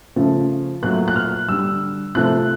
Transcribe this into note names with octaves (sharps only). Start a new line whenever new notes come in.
C#3 F3 A3
A#2 F#3 A3 F#6
F#6
F6
D3 G3 E6
C3 F3 A3 F#6